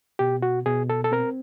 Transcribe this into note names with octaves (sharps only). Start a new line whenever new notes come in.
B2 G4
F#4
B2 G#4
A4
A4
C4 A#4